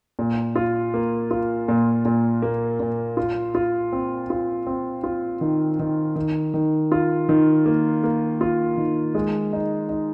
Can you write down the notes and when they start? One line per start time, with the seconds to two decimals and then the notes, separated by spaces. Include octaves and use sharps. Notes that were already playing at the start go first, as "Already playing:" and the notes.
0.19 A#2
0.56 F4
0.94 A#3
1.31 F4
1.68 A#2
2.05 A#2
2.42 A#3
2.80 A#2
3.17 F4
3.55 F4
3.92 C4
4.30 F4
4.67 C4
5.04 F4
5.41 D#3
5.79 D#3
6.16 D#3
6.54 D#3
6.92 F4
7.29 D#3
7.66 A#3
8.04 A#3
8.41 F4
8.78 D#3
9.15 G#3
9.53 D#4
9.89 D#4